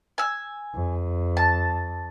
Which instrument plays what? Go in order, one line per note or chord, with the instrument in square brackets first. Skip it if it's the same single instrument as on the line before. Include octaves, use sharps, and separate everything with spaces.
[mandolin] G#5 E6
[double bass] F2
[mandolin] A5